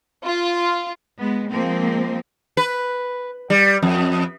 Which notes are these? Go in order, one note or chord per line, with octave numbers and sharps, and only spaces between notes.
F4
G#3 B3
F3 G#3 A#3 C4
B4
G3
F2